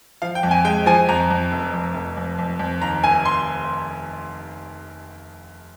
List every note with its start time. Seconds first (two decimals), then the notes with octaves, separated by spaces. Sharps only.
0.22 F3 F5
0.35 G5
0.43 F2
0.51 G#5
0.65 G#3 G5
0.86 F3 G#5
1.09 F2 A#5
1.30 F2
1.52 F1
1.73 F2
1.94 F1
2.17 F2
2.38 F2
2.59 F2
2.81 D#2 A#5
3.04 F1 G#5
3.25 C6